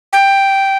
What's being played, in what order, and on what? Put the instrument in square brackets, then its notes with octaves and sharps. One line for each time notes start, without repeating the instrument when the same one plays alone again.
[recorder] G5